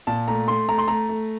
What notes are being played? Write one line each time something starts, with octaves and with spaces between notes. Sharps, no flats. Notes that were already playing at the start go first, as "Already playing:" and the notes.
A#2 A5
A3 A#5
A3 C6
A3 A#5
C6
A3 A#5
A3